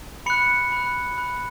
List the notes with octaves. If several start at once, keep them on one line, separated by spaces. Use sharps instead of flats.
B5 F#6 C#7
B5 F#6
B5 F#6